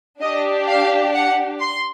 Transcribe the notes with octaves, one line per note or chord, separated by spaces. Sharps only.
D4 G4 D#5
F5
F#5
C6